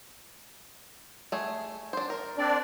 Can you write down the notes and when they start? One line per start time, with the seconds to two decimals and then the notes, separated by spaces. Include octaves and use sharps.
1.32 A3 G#4
1.93 D4 C5
2.10 A#4
2.38 C4 D4 D5